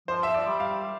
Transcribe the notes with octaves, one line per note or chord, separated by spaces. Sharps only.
F3 C5
E5
D5
G3
F5